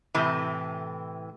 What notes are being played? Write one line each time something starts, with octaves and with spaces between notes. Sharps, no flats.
A2 C3 E3